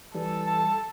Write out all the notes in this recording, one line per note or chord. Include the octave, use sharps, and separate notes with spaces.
E3 G3 A4
A5